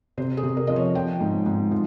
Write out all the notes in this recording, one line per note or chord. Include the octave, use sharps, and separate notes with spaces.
C3 C5
G#4
C3
A#4
F3 D#5
C#5
F3 G5
G#2
G#2
F3